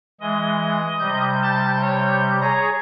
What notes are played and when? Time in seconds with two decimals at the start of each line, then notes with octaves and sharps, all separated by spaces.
0.21 E3 G#3 D#5
0.99 C3 G3 G6
1.43 A5
1.82 C#5
2.41 G#4 C#5 A#5